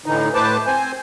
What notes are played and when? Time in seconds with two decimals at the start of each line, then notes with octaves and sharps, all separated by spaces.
0.06 A2 D3 E3 D#4
0.35 A2 A3 B4 C5 A5 D6
0.67 C4 C5 G#5